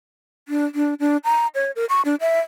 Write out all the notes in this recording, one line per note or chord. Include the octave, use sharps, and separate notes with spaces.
D4
D4
D4
A#5
C#5
A#4
C#6
D4
E5